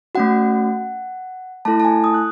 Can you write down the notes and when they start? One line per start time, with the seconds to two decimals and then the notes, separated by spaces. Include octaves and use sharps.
0.15 A3 C#4 F#4 F#5
1.65 A3 E4 A4 A5
1.80 A5
1.85 G#5
2.04 D#6
2.14 F#6